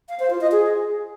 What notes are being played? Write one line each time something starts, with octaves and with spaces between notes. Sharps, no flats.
F5
C5
F4
D#5
G#4